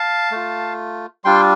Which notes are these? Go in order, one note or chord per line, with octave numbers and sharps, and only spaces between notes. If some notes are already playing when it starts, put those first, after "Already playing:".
Already playing: F5 A5
A3 F4
G3 D4 F4 G5 C6